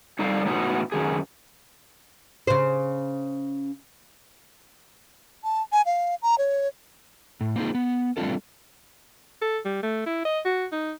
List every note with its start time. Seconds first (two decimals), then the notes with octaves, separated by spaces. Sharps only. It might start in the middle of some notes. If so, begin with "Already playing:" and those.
0.19 F2 G3 D#4 A4 D5 F5
0.45 A2 E3 F#3 B3 D#4 F#4
0.92 F#2 D#3 G#4
2.47 C#3 C5
5.44 A5
5.72 G#5
5.86 F5
6.22 A#5
6.38 C#5
7.41 A2
7.56 A#3 C4 D#4 F4 G#4
7.75 B3
8.17 G3 A3 C4 D4 F4 A4
9.42 A4
9.65 G3
9.83 A3
10.06 E4
10.25 D#5
10.45 F#4
10.72 D#4